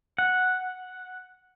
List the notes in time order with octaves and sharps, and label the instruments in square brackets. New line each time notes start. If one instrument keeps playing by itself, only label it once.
[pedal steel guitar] F#5